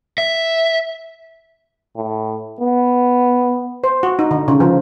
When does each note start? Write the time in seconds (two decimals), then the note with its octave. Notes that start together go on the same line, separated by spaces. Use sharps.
0.18 E5
1.97 A2
2.61 B3
3.84 C5
4.03 F#4
4.19 D#4
4.31 D3
4.48 C#3
4.60 F3